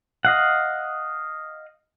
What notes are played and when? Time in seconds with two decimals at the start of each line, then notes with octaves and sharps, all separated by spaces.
0.25 D#5 F5 F#5